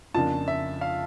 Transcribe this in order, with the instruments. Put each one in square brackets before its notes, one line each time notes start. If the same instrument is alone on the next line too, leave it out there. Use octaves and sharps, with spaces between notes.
[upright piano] F2 C#3 F3 A#3 D4 [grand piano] A5
[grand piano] E5
F5